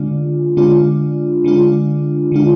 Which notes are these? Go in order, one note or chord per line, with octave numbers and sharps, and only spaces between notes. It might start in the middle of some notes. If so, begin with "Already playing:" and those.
Already playing: D3 G#3 D4 F4
D3 G#3 D4 F4
D3 G#3 D4 F4
D3 G#3 D4 F4